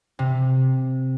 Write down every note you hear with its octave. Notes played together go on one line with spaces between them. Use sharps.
C3